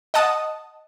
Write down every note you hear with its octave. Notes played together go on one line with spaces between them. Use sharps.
D#5 F#5 A5 D#6